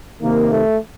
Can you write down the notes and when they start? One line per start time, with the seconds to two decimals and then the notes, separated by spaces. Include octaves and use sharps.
0.22 C3 D#3 A#3
0.51 A3